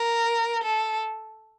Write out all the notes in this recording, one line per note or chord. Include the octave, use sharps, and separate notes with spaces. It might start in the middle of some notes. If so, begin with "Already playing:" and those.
Already playing: A#4
A4